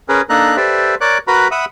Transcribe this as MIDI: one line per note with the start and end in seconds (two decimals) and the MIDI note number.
0.09 0.21 61
0.09 0.21 68
0.09 0.21 70
0.09 0.21 71
0.30 0.57 58
0.30 0.57 62
0.30 0.57 63
0.30 0.57 69
0.30 0.57 82
0.30 0.57 90
0.57 0.95 67
0.57 0.95 69
0.57 0.95 71
0.57 0.95 72
0.57 0.95 74
0.57 0.95 76
1.01 1.18 70
1.01 1.18 73
1.01 1.18 74
1.01 1.18 86
1.01 1.18 90
1.27 1.48 66
1.27 1.48 70
1.27 1.48 71
1.27 1.48 82
1.27 1.48 83
1.51 1.65 76
1.51 1.65 78
1.51 1.65 83
1.51 1.65 87
1.51 1.65 88